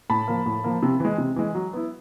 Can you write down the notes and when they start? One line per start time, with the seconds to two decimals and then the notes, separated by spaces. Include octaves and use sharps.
0.10 A2 A5 B5
0.28 F3 A#3
0.46 A2
0.64 F3 A#3
0.82 C3
1.00 E3 G#3
1.18 C3
1.36 E3 G#3
1.55 F#3
1.73 B3 E4